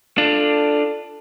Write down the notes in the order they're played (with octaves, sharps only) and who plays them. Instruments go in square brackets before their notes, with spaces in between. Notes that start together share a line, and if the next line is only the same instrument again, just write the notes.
[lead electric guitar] D4 F4 [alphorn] A4